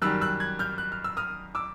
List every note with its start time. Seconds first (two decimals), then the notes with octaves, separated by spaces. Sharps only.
0.02 F#2 D#3 G3 E6 F#6
0.21 E6 F#6
0.40 F#6 G#6
0.59 F6 G6
0.78 F#6
0.92 F6
1.04 E6
1.17 D#6 F6
1.55 D6 E6